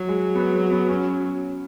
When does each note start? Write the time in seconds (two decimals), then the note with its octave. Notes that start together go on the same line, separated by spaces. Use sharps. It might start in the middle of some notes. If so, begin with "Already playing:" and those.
Already playing: F#3
0.09 G#3
0.35 B3
0.54 G#3
0.71 B3
0.89 C#4